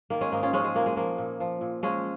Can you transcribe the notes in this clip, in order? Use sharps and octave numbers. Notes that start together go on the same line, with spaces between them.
D#3 A#3
G#3 C#4
G#2 A#3 D#4
C#4 F4
F3 G#3 C#4
G#3
A#2 A#3
G#3
F3 A#3
A#2
F3
A#2
F3 G#3 C#4